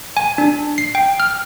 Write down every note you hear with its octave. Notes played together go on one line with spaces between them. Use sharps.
G#5
D4
C7
G5
F6